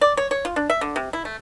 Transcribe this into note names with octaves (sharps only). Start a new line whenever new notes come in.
D5
C#5
C#5
F4
D4
E5
D3
C3
E4
A3